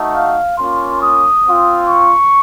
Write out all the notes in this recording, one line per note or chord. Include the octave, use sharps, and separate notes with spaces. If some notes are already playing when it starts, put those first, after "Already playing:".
Already playing: A3 D#4 F#4
F5
A#3 C#4 F4 C6
D#6
C4 F4
C#6